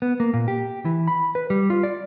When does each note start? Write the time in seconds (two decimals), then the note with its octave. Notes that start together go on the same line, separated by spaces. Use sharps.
0.02 B3
0.20 A#3
0.34 A#2
0.48 G4
0.85 E3
1.08 B5
1.35 B4
1.50 G3
1.70 F4
1.83 D5